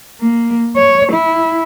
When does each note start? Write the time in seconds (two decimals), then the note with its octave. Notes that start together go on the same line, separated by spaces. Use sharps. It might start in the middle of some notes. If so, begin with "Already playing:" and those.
0.21 A#3
0.77 C#5
1.12 E4